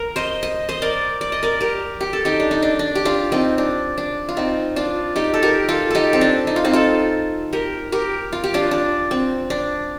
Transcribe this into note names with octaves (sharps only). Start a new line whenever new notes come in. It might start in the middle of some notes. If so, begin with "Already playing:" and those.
Already playing: A#4
C5 D#5
D#5
C5 D#5
A#4 D5
D5
D#5
A#4 D5
G4 A#4
G4
A4
D#4 G4
D4
D#4
D4
D4
G4
D4 F4
C4 D#4
D4
D4
F4
C4 D#4
D4 F4
D#4 G4
A4
G4 A#4
F4 A4
D#4 G4 A4
C4
D4
D#4
F4
C4 D#4
F4 A4
G4 A#4
G4 A#4
F4
G4
D4 F4
D4
C4
D4